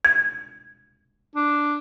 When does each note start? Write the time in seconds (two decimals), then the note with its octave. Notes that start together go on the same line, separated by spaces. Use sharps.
0.05 G#6
1.35 D4